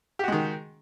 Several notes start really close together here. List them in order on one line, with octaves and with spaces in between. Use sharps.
G4 F#4 G#3 D#3